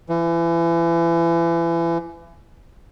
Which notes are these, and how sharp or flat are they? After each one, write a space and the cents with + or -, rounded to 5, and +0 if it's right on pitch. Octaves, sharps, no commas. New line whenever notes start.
E3 +30